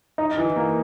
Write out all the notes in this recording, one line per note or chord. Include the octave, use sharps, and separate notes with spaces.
D#4
E3
A#3